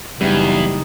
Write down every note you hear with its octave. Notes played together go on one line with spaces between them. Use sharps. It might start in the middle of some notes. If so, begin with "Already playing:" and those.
F#1 E2 G3 D#4